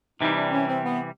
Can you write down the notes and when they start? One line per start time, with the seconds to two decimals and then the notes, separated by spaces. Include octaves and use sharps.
0.21 C3 E3 G3 D#4
0.37 D4
0.52 C#4
0.68 C4
0.85 B3